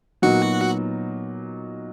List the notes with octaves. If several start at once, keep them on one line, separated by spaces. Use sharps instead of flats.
A#2 F#3 B3 D#4 F#4 F#5